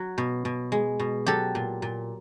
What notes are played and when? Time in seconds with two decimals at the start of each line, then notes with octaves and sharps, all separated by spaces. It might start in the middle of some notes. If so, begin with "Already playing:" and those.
Already playing: F#3
0.18 B2
0.45 B2
0.72 G#3
1.00 B2
1.26 F#3 G4 A4
1.55 A#2
1.82 A#2